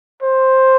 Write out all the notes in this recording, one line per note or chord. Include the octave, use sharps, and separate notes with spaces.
C5